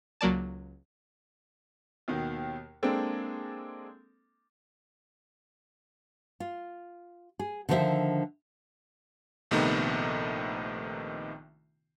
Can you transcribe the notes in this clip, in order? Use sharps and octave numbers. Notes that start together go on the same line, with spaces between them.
C#2 F#3 A#3 D5 A5
D#2 B2 D#3
G#3 A#3 C4 D4 A4
F4
G#4
D3 D#3 F3 A#4 C5 E5
A#1 C3 D#3 A3 B3 D#4